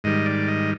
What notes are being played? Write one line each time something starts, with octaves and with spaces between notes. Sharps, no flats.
G#2 D#3 G3 D#5
D5
D#5